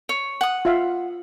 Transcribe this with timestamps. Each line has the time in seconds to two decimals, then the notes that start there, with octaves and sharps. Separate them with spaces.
0.09 C#5
0.41 F#5 D#6
0.65 F4 E5 F5